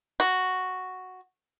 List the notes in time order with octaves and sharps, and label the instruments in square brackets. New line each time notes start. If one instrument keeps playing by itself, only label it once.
[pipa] F#4